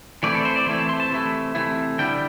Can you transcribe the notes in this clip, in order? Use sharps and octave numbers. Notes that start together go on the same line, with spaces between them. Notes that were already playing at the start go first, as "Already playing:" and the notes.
E3 A3 C4 E4 D5
A4
C5
D5
E3 A3 C4 E4
A5
C6
A5
C3 E3 A3 E4
C3 E3 A3 E4
D3 G3 E4 G5